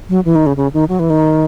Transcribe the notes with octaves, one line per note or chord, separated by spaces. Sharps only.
F#3
E3
D#3
C#3
C#3
D#3
F#3
E3
D#3